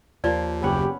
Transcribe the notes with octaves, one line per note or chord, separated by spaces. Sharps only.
D#2 F3 A#3 D5
F#1 B3 C#4 G4 F#5